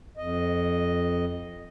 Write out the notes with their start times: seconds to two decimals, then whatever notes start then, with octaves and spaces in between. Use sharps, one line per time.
0.17 F2 D#5